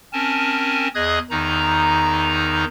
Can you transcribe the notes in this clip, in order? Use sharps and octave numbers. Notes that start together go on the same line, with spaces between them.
C4 C#4 A#4 G#5 A5
E2 G#4 D#5 D#6 F#6 G#6
E2 D#3 D#4 A#5